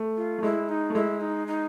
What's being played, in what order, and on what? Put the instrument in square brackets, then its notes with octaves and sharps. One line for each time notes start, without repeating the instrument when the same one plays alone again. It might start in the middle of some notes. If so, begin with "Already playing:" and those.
Already playing: [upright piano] A3
[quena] F4
[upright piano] A3
[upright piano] G#3 [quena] E4
[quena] D#4
[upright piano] A3
[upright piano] G#3 [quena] E4
[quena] D#4
D#4